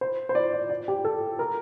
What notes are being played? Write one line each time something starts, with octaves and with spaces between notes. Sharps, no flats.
C5
C5
D5
D5
D5
G4
A4
A#4